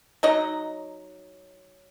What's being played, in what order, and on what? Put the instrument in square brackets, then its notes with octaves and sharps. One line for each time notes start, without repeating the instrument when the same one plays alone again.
[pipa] F#3 D#4 D#5